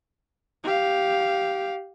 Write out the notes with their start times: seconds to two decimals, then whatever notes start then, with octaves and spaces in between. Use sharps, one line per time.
0.63 G4 F5